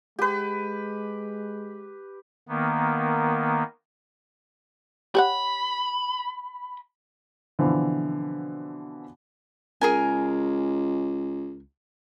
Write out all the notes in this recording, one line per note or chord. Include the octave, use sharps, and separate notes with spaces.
G#3 G4 B4
D#3 A#3 B3
G4 C#5 F#5 B5
B2 D3 E3 F3 C4
C#2 G#4 A#4 G#5